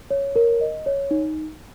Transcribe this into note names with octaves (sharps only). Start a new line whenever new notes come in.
C#5
A#4
D#5
C#5
D#4